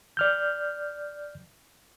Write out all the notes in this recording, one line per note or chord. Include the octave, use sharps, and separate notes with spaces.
D5 F6 G6